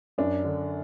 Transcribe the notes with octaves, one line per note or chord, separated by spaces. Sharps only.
F#2 D4
D3